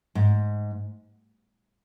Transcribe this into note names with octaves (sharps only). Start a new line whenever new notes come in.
G#2